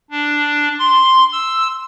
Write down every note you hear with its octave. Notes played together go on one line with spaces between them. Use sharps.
D4
C6
E6